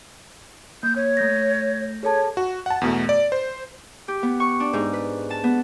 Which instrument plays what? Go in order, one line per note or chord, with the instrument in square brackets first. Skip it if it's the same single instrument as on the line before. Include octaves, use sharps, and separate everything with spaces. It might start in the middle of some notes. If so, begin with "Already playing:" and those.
[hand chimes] A#3 [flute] G6
[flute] C#5
[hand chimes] A3 G6 A#6
[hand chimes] G#4 A4 A5 [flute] C#5
[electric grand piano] F#4
F#5 A5
E2 B2 A3
D5
C5
[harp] G4
B3
C#6
D4
G#2
B4
A5
B3